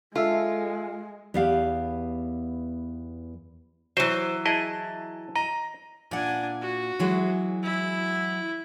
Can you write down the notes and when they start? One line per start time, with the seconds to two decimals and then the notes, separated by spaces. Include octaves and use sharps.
0.16 G#3 F4 A4 E5
1.34 E2 B3 G4 D5 F5
3.97 E3 F#3 C5
4.46 E4 G#4 D#5 A5
5.36 D#5 A#5
6.11 A#2 D4 F#5 G#5
6.62 F#4
6.99 E3 F#3 G#3
7.63 E4